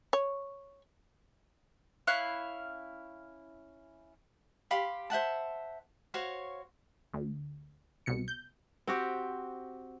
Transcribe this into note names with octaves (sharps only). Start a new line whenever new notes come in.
C#5
C#4 E4 F5 F#6
G4 F5 B5 C6
C5 E5 F#5 A5
F#4 C5 C#5 F5
D2
C2 B2 C#7
G6
C4 F#4 G4